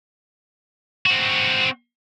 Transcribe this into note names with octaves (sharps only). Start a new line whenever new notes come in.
C4 F#4